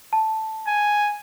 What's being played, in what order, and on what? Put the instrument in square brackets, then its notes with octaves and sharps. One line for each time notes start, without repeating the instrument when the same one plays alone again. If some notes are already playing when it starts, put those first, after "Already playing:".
[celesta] A5
[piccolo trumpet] G#5